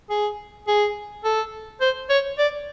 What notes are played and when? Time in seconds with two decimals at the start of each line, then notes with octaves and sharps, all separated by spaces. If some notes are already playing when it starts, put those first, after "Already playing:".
0.10 G#4
0.68 G#4
1.24 A4
1.81 C5
2.10 C#5
2.39 D5